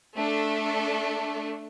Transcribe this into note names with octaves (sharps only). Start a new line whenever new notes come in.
A3 D4 A4